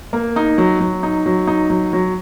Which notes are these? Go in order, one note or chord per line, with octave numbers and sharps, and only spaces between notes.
A#3
D#4
F#3
F#3
D#4
F#3
D#4
F#3
F#3